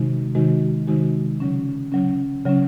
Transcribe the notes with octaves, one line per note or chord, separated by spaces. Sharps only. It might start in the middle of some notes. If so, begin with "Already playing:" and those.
Already playing: C3 D#3 G#3 D#4 F#4
C3 D#3 G#3 D#4 F#4
C3 D#3 G#3 D#4 F#4
C#3 F#3 C#4
C#3 F#3 C#4
C#3 F#3 C#4